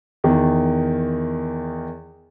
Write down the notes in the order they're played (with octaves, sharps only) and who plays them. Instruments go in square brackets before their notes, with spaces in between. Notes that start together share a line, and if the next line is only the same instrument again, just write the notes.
[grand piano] E2 D#3